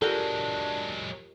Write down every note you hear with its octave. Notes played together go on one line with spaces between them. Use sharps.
F#3 G#3 D4 F4 G4 A4 A#4